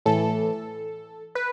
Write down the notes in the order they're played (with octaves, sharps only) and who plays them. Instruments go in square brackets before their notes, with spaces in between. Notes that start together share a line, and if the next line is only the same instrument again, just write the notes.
[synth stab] A2 E3 A4
B4